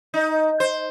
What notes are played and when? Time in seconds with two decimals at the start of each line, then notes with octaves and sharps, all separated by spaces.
0.14 D#4
0.60 C5